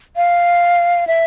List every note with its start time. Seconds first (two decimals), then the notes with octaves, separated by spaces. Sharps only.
0.16 F5
1.07 E5